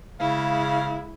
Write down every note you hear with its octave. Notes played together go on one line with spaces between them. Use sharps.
C#3 G#3 E4 F5